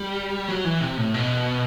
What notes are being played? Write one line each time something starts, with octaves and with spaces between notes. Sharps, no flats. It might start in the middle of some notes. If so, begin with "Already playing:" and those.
Already playing: G3
F#3
E3
C3
A2
B2